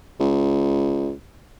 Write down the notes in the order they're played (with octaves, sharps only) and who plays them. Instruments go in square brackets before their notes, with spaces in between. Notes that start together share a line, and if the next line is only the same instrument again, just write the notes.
[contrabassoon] C#2